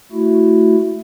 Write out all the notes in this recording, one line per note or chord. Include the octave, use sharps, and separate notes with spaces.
A3 E4 F#4